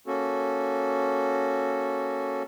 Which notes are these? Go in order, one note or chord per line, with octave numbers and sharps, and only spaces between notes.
A#3 C#4 F#4 A4